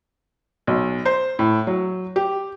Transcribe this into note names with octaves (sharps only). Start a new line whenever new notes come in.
B1
C5
A2
F#3
G4